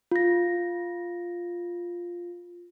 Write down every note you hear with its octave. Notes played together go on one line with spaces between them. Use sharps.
F4 A#6